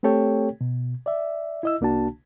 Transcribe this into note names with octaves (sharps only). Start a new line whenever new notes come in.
A3 C4 G4 A4 C#5 G5
B2
D5 E5
E4 D#5 E6
C2 A#3 D4 F#4 A5